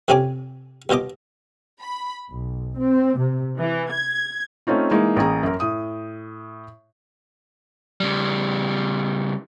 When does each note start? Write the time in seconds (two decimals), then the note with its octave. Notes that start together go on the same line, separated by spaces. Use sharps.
0.08 F2 C3 C4 C#4 G#5 D6
0.89 D#2 B2 F4 D#5 D6
1.81 B5
2.32 B1
2.79 C4
3.19 C3
3.59 E3
3.91 G#6
4.67 A3 C4 C#4 D#4 F4
4.91 E3 G#3 A#3 D#4
5.16 A1 A#3 G#4 A#5
5.43 F#2 A#4
5.60 A2 D#6
8.00 C#3 G3